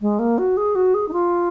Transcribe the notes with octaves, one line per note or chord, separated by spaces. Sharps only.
G#3
A#3
F#4
G#4
F#4
G#4
D#4
F4